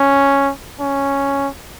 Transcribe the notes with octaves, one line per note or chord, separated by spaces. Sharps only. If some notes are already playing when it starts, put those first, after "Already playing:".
Already playing: C#4
C#4